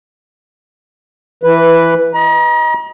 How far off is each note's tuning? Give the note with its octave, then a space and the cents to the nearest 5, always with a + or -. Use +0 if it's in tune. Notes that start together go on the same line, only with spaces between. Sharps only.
E3 +10 B4 +0
D#5 +0 A#5 +40